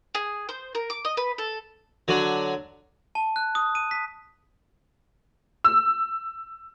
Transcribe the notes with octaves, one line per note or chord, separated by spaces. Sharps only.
G#4
C5
A#4
D6
D#5
B4
A4
D3 F#3 D4
A5
F#6
D#6
D#7
B6
E6